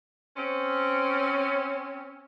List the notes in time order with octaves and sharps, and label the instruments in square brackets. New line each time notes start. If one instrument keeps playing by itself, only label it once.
[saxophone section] C4 C#4